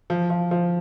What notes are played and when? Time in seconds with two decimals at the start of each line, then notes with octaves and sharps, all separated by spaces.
0.10 F3
0.30 F3
0.51 F3